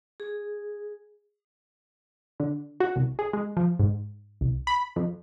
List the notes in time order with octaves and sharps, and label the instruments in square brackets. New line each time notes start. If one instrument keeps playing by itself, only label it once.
[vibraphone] G#4
[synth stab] D3
F#4
C2
G#4
G#3
F3
G#2
C2
B5
F2